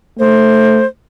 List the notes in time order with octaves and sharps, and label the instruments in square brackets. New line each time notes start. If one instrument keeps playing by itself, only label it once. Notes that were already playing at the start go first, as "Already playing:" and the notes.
[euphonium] A3 [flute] C5